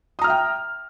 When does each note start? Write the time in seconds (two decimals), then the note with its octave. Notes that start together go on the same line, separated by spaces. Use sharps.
0.19 D#6
0.21 A#5
0.24 F6
0.27 E5
0.30 G5